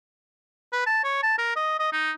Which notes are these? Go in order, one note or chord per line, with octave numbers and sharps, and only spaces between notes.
B4
A5
C#5
A5
A#4
D#5
D#5
D#4